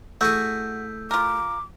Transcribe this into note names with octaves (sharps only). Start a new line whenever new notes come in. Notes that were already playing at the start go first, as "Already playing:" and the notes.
A3 E4 F#4 G#4 E6 G6
F4 A#4 D6